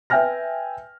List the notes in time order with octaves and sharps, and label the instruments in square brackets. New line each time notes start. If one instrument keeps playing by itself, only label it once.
[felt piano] B4 E5 G5 G#5 F6 A#6